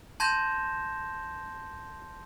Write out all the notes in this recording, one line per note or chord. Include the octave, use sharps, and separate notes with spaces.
A5 C6 G6 G#6 A#6 E7